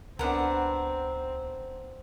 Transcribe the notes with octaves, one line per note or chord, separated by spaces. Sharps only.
C#2 B3 C4 D4 A#4 F#5